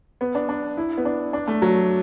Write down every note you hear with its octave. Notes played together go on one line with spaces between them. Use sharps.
B3
D4
D4
E4
B3
D4
D4
A3
F#3